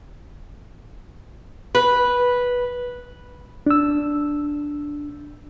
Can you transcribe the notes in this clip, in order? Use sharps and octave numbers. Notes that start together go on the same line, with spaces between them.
B4
D4 E6